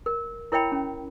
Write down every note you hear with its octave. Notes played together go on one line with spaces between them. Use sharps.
A#4
E4 A#4 C#5 E5 G5 B5
C#4